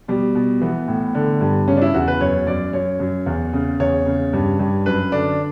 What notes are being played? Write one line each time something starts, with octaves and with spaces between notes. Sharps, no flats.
B2 G3
B2
E3 B3
A2
D3
G2
C#3 C#4
D4
E4
E2 F#4
B4
F#2 C#5
F#2 D5
F#2 C#5
F#2
E2
C#3
E2 C#5
C#3
G2
G2
F#2 B4
D3 D4